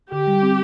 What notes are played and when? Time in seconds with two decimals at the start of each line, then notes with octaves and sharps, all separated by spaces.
0.12 D3 G4
0.27 G3
0.43 C4